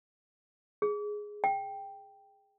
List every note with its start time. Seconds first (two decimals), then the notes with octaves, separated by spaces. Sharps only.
0.82 G#4
1.44 G5